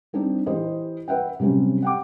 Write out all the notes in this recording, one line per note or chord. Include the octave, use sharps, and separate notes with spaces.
G3 C4 D4 D#4
E3 G4 C5 D#5
B4 E5 F#5 G5
C3 F#3 G3 C4 C#4
F#5 G5 D6